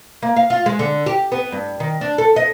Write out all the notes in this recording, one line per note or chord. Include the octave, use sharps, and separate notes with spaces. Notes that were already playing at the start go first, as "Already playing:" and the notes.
A#3
F5
F4
G#3
D3
G4
B3
G2
D#3
D4
A4
D#5